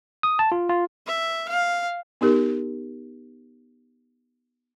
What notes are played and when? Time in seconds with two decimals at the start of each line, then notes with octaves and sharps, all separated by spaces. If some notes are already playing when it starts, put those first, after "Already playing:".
0.23 D#6
0.39 A5
0.52 F4
0.69 F4
1.07 E5
1.48 F5
2.21 B3 D#4 G4 A#4